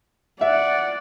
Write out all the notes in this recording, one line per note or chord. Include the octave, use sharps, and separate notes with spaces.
D5 E5 F#5